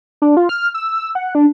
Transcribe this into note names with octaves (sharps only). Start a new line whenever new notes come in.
D4
F4
F6
E6
E6
F#5
D4